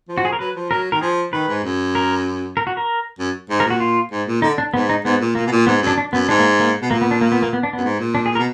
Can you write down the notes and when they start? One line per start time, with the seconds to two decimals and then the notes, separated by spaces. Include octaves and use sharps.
0.09 F3
0.18 F#4
0.25 G#4
0.33 A#4
0.39 F#3 B4
0.55 F3
0.70 F#3 A#4
0.92 D#3 A#4
1.01 F3 G#4
1.33 D#3 B4
1.48 G#2
1.63 F#2
1.95 A#4
2.57 A#4
2.67 F#4
2.77 A#4
3.19 F#2
3.50 G#2
3.60 A#4
3.65 A#2
3.70 F#4
3.80 F4
4.11 G#2
4.27 A#2
4.42 D3 D#4
4.58 D4
4.74 G#2 B3
4.89 D#4
5.05 G#2 B3
5.20 A#2
5.35 A#2 A#3
5.46 B2
5.52 A#2
5.67 G#2 B3
5.82 F#2
5.87 D4
5.98 D4
6.13 F#2 B3
6.29 G#2 D4
6.39 A#3
6.60 A#3
6.82 B2
6.91 A#2 A#3
7.02 B3
7.11 D4
7.21 A#3
7.32 B3
7.42 A#3
7.53 B3
7.63 D4
7.73 F#2 B3
7.84 G#2
7.99 A#2
8.15 D4
8.26 G#4
8.30 A#2
8.35 A#4
8.38 B2